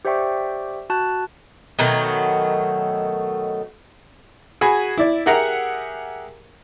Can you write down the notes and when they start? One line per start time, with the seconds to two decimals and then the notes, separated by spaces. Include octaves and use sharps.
0.05 G4 C5 D5 E5 G5 C#6
0.90 F#4 A5 F#6
1.79 B2 D#3 F#3 A3
4.61 F#4 G#4 G#5 B5
4.98 E4 D5
5.26 G4 G#4 A#4 E5 F#5 A#5